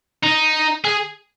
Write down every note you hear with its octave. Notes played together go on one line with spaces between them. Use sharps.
D#4
G#4